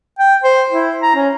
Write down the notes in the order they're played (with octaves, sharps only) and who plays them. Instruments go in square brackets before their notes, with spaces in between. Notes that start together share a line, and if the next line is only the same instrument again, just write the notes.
[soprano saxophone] G5
C5
E4
A#5
C#4